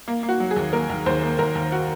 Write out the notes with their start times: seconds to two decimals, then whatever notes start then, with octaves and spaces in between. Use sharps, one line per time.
0.08 A#3
0.23 A#3
0.29 F#4
0.40 F#3
0.51 G#4
0.56 D#2
0.73 A#3 A#4
0.90 D#2
1.06 D#2 C5
1.23 A#3
1.39 D#2 A#4
1.55 D#2
1.72 F#4